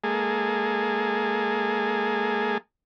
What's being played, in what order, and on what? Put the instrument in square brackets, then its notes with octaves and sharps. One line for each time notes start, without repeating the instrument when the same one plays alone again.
[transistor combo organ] G#3 A#3 G#4 A4